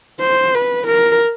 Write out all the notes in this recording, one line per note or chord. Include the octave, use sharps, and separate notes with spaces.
C5
B4
A#4